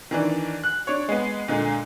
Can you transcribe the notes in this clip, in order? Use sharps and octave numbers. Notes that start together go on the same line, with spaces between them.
D#3 E3 D4
F#6
D4 C#5
G#3 B3
A#2 D3 G#3